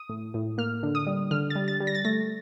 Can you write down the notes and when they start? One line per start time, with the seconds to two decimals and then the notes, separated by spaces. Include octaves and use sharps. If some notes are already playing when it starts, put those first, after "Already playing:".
Already playing: D#6
0.09 A2
0.34 A2
0.58 A#3 F6
0.83 D3
0.95 D#6
1.07 G3
1.31 D3 F6
1.50 A6
1.55 G3
1.68 A6
1.80 G3
1.87 A#6
1.95 A6
2.05 A3 A#6